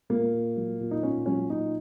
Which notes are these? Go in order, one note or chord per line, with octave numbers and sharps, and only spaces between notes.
A#2 A#3
A#2
F#3
A#2
D#4
A#2 C#4
F#3 C#4
A#2 D#4